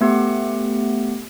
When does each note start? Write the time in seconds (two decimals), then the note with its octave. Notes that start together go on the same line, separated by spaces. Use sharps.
0.01 A3 B3 G4 F#5